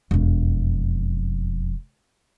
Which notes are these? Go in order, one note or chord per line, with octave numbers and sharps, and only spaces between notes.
E1 F2